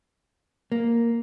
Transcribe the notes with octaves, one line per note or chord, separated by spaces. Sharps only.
A#3